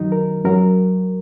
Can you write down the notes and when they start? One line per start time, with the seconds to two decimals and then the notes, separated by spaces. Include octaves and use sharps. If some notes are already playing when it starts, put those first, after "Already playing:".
Already playing: F#2 D#3 F#3 D#4
0.12 A#4
0.44 F#2 F#3 A#4